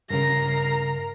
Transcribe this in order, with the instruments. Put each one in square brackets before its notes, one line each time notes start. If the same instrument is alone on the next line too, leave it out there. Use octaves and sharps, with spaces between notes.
[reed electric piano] G2 C#3 [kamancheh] A#4 A#5 [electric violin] A#6 C7